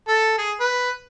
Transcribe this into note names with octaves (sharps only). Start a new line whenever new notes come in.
A4
G#4
B4